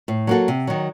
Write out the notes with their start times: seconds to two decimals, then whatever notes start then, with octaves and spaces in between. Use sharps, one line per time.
0.08 A2
0.27 F#3 A#3 F#4 A4
0.48 C3
0.67 D#3 F#3